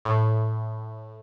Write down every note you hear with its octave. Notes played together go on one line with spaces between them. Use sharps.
A2